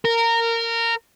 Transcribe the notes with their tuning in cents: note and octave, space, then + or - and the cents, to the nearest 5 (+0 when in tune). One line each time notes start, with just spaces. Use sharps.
A#4 -15